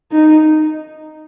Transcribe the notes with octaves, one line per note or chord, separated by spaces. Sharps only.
D#4